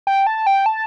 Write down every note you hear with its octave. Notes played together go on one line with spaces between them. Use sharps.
G5
A5
G5
A5